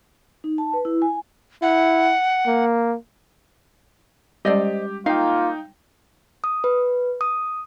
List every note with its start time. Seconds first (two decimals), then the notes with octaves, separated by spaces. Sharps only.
0.44 D#4
0.58 A5
0.73 B4
0.85 E4
1.02 G#5
1.62 E4 F#5
2.47 A#3
4.45 G3 G#3 C#4 G4 C5 D5 D#5
5.06 A#3 D#4 F4 F5 G5
6.44 D#6
6.64 B4
7.21 D#6